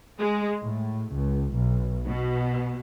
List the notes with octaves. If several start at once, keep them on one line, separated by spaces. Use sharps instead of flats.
G#3
A2
C#2
B1
B2